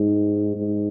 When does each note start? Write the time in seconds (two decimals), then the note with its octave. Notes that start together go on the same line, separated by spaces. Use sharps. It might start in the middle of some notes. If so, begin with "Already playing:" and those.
Already playing: G#2
0.55 G#2